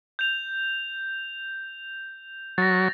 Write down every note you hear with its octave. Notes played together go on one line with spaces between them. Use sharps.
G6 F7
F#3 A6 A#6